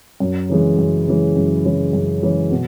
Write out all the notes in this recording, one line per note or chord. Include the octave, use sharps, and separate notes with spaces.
F#2
C#3 E3 G#3
F#2
C#3 E3 G#3
F#2
C#3 E3 G#3
F#2
C#3 E3 G#3
B2